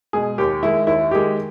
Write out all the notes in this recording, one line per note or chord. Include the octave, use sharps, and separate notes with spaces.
B2 G#3 G#4
D#2 G4
D#3 G#3 E4
D#2 E4
D#3 G#3 G4